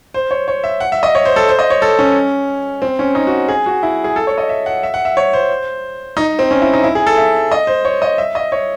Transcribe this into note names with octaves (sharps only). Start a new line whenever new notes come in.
C5
C#5
C#5
E5
F#5
E5
D#5
C#5
C5
A4
C5
D#5
C#5
A4
C#4
C4
C#4
D#4
F#4
G#4
F#4
E4
G#4
A4
C#5
D#5
E5
F#5
E5
F#5
E5
C#5
C5
D#4
C4
C#4
E4
D#4
E4
G#4
A4
E5
D#5
C5
C#5
D#5
E5
D#5
C#5